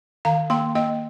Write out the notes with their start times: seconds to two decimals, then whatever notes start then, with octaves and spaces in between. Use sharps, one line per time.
0.25 D#3 F5 A#5
0.50 A#3 G5 C6
0.75 A#3 D#5 G5